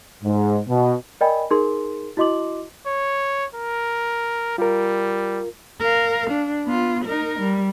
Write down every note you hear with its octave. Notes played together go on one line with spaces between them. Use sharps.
G#2
B2
A#4 D5 D#5 G5 G#5 B5
D#4 G#4 A#4 C6
E4 F#4 D#5 C6 D6 F#7
C#5
A#4
G3 F4 A#4
A#4 F5
D4
B3 F4
D#4 A#4
G3